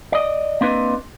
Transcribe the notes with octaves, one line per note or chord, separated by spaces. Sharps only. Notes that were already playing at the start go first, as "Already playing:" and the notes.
D5 D#5
A#3 C4 D4 B4 D#5